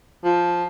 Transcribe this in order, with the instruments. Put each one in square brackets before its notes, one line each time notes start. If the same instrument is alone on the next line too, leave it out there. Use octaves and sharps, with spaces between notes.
[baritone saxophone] F3